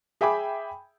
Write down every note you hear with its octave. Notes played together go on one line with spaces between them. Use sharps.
G#4 E5 G5 G#5 B5 D6